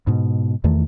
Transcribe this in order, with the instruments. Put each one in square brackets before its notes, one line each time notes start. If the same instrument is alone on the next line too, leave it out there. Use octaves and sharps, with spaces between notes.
[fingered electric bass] G#2 B2
E2 D#3 A3